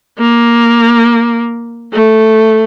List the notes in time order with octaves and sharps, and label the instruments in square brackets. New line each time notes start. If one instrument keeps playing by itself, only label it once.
[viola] A#3
A3